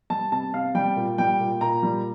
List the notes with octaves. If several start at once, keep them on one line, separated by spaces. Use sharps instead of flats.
G3 A5
C3 A5
C3 F5
G3 G5
A#2
G3 G5
A#2
A#2 A#5
G3